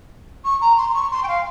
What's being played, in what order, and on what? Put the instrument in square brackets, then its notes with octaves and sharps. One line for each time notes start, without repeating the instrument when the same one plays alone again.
[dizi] C#6
A#5
C6
C#6
C6
G5
F5